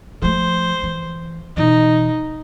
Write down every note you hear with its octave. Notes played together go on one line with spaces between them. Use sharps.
F3 A3 C5
E3
B2 E3 D#4